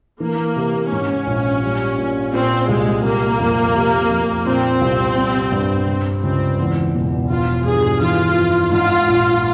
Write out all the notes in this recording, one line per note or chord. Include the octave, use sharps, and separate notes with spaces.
E3 A#3
C3
G#2 C#4
A#1
G3
A#2
A#2 C4
C2 G#3
C3 A#3
F2
C3
F2
A#2 C4
C2
G3
G2
C3
C#2 C4
E2
E1
F3 F4
G2 G#4
E3 F4
F2
G#2 F4
A#1